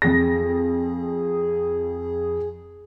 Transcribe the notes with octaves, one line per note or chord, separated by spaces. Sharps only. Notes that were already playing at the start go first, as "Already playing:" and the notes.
F2 G#4 A#6